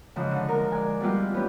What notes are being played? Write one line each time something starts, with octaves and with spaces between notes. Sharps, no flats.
G#2 C#3 E3 F3
D3
G#3 A#4
D5 G#5
G3 G#3 B3 E4 F4 G4
E3 B3 C#4 G4